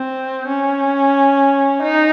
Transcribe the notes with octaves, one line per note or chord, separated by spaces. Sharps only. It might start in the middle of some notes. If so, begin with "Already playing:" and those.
Already playing: C4
C#4
D#4